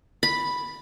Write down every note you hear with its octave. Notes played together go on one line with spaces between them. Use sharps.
B5